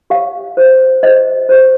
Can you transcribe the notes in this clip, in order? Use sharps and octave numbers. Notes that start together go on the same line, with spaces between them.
G4 C#5 F5
G4 C5
G4 C5 D#5
G4 C5